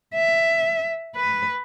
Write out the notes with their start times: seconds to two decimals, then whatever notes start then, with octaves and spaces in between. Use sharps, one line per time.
0.15 E5
1.16 B4